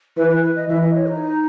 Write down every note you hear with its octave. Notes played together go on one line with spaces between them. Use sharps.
E3 B4
B4
B4
D#5
E3 E5
D#5
C#5
D#4